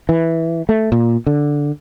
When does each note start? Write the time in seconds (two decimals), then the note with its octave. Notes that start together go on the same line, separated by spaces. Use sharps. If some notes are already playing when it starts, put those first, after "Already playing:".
0.09 E3
0.69 A3
0.92 A#2
1.27 D3